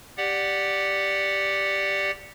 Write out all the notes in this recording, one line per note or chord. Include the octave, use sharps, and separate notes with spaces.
G4 D5 F#5